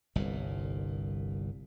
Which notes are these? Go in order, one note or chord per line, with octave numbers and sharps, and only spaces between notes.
G1 C2 A#2